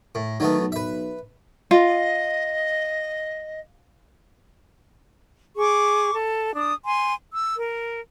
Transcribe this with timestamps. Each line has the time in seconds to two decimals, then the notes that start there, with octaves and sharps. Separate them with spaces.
0.15 A2
0.40 D#3 F#3 A3 B3
0.60 B1
0.72 B4 E5
1.71 F4 D#5
5.57 G#4 C#6 D6
6.14 A4
6.54 D4 D#6
6.85 G#5 C6
7.33 E6
7.57 A#4